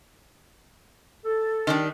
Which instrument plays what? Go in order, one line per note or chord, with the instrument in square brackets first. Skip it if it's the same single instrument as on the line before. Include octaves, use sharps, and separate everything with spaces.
[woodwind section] A4
[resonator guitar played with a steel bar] D#3 G3 D4